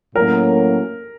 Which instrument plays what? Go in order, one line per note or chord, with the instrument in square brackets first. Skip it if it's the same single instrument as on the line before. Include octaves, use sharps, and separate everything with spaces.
[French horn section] A2 F#3 A#3 C#4 [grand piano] A#4